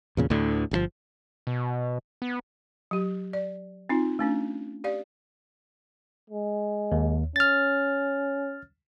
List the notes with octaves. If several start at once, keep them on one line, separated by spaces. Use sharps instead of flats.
E2 A#2 C#3
D2 A2 D3
G1 C#3 F3
B2
B3
F#3 G4
D5
C4 D#4 F4
A3 C#4 D4
G4 D5 F5
G#3
D#2
C#4 F6 A6